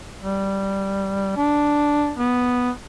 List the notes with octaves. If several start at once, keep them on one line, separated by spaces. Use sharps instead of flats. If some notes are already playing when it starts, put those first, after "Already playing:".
G3
D4
B3